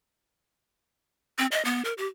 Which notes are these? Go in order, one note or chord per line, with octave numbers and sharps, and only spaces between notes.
C4
D#5
B3
A#4
G4